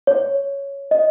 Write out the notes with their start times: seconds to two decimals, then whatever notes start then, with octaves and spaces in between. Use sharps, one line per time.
0.07 C#5
0.91 D#5